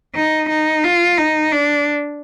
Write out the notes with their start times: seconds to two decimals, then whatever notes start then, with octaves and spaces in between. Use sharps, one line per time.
0.15 D#4
0.49 D#4
0.84 F4
1.18 D#4
1.52 D4